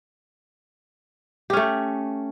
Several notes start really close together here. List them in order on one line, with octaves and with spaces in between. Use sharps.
G4 C#4 A3